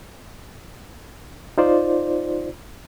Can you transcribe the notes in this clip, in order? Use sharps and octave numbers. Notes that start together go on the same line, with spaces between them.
D#4 F4 C5 D5